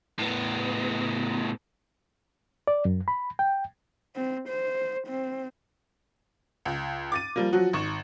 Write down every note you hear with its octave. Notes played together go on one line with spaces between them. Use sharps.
A2 B3
D5
F#2
B5
G5
C4
C5
C4
C#2
D6 A6 D#7
F3 G3 A#3
F3 F#3 F#4
G#1 C#6 E7